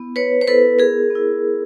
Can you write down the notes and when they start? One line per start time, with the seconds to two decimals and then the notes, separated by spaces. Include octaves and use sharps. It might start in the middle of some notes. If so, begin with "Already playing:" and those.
Already playing: B3 E4
0.16 B4 C#5
0.41 C5
0.48 B3 E4 A4 B4
0.79 G#4 A#4
1.10 B3 E4